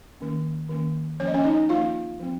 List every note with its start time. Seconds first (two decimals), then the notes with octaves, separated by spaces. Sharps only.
0.21 D#3 A#3 C#4
0.69 D#3 A#3 C#4
1.20 F3 A#3 C#4 C#5
1.27 D#5
1.34 C#4 C#5
1.44 D#4 D#5
1.69 F3 A#3 C#4 F4 F5
2.20 F3 C4